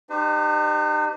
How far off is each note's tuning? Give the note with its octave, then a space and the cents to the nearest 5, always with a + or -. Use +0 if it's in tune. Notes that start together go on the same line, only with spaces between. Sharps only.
D#4 -45 G4 +0 C5 -35